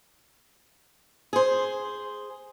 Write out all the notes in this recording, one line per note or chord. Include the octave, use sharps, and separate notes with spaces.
G#4 C5